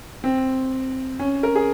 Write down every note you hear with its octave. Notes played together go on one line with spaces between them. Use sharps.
C4
C#4
A#4
G#4